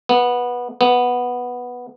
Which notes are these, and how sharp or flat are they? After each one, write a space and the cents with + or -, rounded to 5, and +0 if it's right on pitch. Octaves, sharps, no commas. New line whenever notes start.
B3 -15
B3 -5